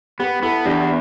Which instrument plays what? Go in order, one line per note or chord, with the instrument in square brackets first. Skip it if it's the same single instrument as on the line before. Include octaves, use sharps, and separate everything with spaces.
[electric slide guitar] B3 [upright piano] G4 B4
[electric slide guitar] B3 [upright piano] E4 A4
[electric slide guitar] E2 [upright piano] D4 G4